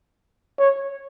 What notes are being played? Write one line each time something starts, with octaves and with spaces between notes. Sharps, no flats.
C#5